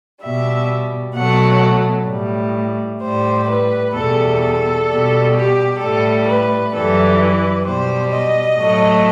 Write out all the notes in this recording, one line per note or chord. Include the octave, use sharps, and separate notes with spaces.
B2 G3 E5
B2 F#3 A3 F#5
A2 G3
A2 G3 C5
B4
E2 B2 G3 A4
A4
B2 G3
G4
A2 G3 A4
B4
F#2 E3 G3 A4
B4
B2 G3 C5
D#5
A2 F#3 A3